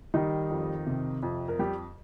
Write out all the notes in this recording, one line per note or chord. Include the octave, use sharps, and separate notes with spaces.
D#3 G3 D#4
F2
C3
F2
A#4
G3 G4